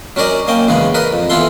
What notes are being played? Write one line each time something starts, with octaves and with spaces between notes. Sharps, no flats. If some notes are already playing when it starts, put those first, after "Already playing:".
F#3 C#4 A#4 D5 D#5
A#3 C#4 D#5 G5
E2 C#3 G#3 B3
A#4 B4 D#5
F2
E3 B3 F4 A4 C6